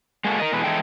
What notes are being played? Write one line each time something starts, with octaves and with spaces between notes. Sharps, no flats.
G#3 A#3 F#4 A4
A#4 D#5
B2 E3 G#3 A4 B4
E3 G3 G#3 D#4 A4 G5